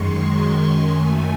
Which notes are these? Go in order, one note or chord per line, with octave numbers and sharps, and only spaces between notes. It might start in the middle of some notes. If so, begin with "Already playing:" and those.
Already playing: F#2 D#3 G#3 C6 C#6
C6
F#2 D#3 A3 G#5